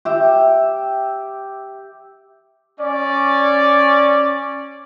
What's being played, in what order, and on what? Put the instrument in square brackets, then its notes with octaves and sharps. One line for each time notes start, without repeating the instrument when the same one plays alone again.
[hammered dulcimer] G4 E5
[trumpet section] C#4 D5